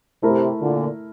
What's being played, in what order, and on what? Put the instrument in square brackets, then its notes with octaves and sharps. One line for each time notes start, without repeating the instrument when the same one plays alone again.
[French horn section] C3 [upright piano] A3 E4 A#4
[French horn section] A#2 D3